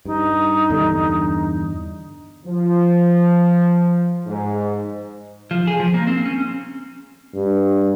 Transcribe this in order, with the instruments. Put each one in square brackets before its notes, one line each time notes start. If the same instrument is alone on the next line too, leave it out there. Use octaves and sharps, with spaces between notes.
[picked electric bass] G2 [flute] D#4
[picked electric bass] E2 G2 D3
[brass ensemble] F3
G#2
[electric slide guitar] F3
G#4
F3
A#3
C4
C#4
[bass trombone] G2